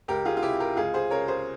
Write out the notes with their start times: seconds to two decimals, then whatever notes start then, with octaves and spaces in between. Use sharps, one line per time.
0.08 C#2 G4 A#4
0.25 F4 G#4
0.37 F4
0.42 C3 E4 G4
0.60 G4 A#4
0.76 C#2 F4 G#4
0.94 G#4 C5
1.10 C#3 A#4 C#5
1.28 G#4 C5